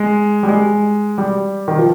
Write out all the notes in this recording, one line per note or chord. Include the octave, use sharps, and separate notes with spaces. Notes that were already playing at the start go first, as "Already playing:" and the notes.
Already playing: G#3
G3
G#3
G3
D#3
F3